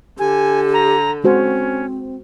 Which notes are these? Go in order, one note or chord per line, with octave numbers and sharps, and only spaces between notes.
D3 G4 G#5
A#5
G#3 C4 C#4 F#4 C5